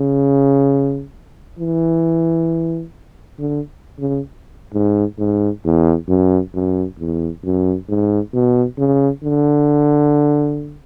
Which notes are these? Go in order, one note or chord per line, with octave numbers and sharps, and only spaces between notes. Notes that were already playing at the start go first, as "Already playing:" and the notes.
Already playing: C#3
E3
D3
C#3
G#2
G#2
E2
F#2
F#2
E2
F#2
G#2
B2
C#3
D3